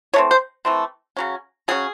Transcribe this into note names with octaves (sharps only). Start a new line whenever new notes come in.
E3 A3 C4 C#5
C5
E3 A3 C4
C#3 F#3 C#4
C#3 F#3 C#4 G#4